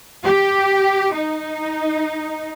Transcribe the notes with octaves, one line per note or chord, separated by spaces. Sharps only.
G4
D#4